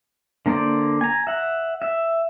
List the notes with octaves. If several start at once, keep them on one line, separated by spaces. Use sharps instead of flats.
D3 A#3 C5 D5
G#5 A#5
E5 F#5
E5